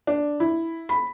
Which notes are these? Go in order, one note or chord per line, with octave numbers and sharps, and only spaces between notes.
D4
E4
B5